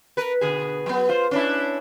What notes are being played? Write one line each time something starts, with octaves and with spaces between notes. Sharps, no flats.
A#4 B4
B2 D3 G#4
F#3 B3
F4 C5
C#4 D4 E4